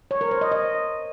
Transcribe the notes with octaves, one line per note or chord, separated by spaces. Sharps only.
C#5
A#4
C5
D#5
D#5